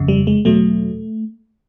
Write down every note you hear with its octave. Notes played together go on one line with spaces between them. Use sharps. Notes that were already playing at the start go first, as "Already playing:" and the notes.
Already playing: G1 F2 C#3
G3
G#3
E2 B2 F#3 A3